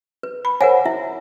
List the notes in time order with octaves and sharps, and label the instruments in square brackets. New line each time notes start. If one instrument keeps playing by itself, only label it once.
[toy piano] B4
[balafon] B5
[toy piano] A#4 F#5 G#5 [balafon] C5 C#5
[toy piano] E4 E5